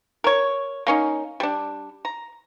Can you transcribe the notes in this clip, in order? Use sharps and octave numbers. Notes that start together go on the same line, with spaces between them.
A#4 C#5
A#3 C#4 D#4
G3 D4
A#5